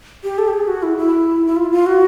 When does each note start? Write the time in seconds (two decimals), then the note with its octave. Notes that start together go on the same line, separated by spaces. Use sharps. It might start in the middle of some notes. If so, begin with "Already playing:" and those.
0.24 G4
0.38 A4
0.48 G4
0.53 G#4
0.68 F#4
0.83 E4
0.97 E4
1.46 E4
1.56 F4
1.72 F4
1.86 F#4